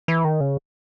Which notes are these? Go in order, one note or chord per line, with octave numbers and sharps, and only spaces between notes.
E3
D#3
C#3